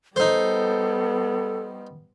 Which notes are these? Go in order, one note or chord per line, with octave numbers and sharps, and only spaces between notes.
G3 B3 D#4 A4 C5